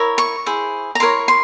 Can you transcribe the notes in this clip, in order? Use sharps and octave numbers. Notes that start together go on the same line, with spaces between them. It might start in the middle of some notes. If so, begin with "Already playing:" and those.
Already playing: E4 A#4 C#5
C#6
E4 G#4 C5
A#5
E4 A#4 C#5 C6
C6